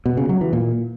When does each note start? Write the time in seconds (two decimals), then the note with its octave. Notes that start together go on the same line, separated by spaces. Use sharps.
0.06 B2
0.17 C#3
0.29 F#3
0.41 E3
0.53 A#2